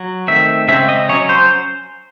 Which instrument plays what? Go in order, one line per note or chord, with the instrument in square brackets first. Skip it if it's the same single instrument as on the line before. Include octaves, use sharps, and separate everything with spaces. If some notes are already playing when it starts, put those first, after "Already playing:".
Already playing: [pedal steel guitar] F#3
D#3 A3 C4 E5
C#3 G#3 C4 E5
D#5
F#3 C#4 C#5
C5